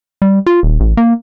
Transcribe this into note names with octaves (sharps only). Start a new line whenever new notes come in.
G3
F4
D#1
A1
A#3